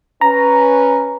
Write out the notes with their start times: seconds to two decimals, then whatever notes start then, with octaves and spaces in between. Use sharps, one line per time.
0.21 C#4 B4 A#5